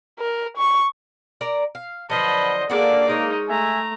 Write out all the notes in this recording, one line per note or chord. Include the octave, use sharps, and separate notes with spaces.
A#4
C#6
A#4 D5 A#5
F5
D3 F3 F#3 B4 C5 D#5 A5 B5
G#3 A#3 D4 F#4 A4 D5
G#3 D#4 A#4 C#5
A3 E5 G#5 A#5